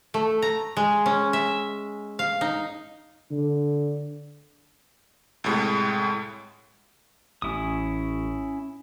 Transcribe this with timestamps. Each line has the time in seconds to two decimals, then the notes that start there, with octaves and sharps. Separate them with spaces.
0.14 A3
0.42 A#5
0.77 G#3
1.06 C#4
1.33 E5
2.19 F5
2.41 D#4
3.31 D3
5.44 C2 A2 G#3
7.42 A1 C#4 E4 D#6